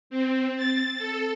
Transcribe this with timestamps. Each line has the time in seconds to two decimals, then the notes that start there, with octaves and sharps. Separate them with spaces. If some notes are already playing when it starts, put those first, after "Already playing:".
0.10 C4
0.57 A6
0.99 A4